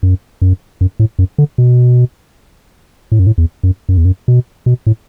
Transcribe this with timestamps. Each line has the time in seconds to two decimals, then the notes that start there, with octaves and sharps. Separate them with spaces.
0.03 F#2
0.42 F#2
0.81 F#2
1.00 A2
1.19 F#2
1.38 D3
1.58 B2
3.12 A2
3.19 F#2
3.27 A2
3.38 E2
3.63 F#2
3.89 F#2
3.97 E2
4.05 F#2
4.28 B2
4.66 B2
4.87 A2